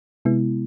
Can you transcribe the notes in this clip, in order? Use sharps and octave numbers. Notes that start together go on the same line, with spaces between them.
C3 G#3 B3 E4